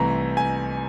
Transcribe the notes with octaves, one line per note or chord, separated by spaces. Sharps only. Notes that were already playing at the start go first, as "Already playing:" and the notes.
Already playing: C2 C3 E3 A3 A#5
G#5